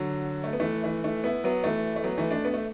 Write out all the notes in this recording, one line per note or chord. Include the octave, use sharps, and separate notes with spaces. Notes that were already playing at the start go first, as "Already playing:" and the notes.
Already playing: D3 F#3
A3
B3
E3 A3
E3 A3
E3 A3
B3 E4
F#3 B3
E3 A3
A3
F#3 B3
E3 A3
A3 D4
B3
A3